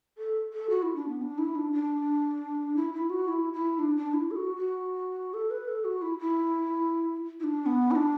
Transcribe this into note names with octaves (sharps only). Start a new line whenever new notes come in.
A4
A4
F#4
E4
D4
B3
D4
E4
D4
D4
E4
E4
F#4
E4
E4
D4
D4
E4
A4
F#4
F#4
A4
B4
A4
F#4
E4
E4
E4
D4
B3
E4
D4